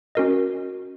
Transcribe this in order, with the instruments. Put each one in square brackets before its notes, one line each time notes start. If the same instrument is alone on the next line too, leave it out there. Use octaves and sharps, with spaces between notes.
[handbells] C#4 F#4 A#4 D#5